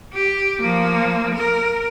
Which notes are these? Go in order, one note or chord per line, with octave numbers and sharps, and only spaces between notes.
G4
F3 A#3
A#4